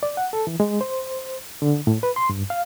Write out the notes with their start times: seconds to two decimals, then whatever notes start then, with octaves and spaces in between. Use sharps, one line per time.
0.03 D5
0.17 F#5
0.33 A4
0.47 E3
0.60 G#3
0.81 C5
1.62 D3
1.87 A2
2.03 B4
2.16 C6
2.29 G2
2.50 F5